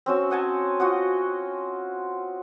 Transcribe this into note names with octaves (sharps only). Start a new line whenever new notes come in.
C4 C#4 F#4 E6
D#5 F#5 G#5 A5
F4 F#4 D#5 F#5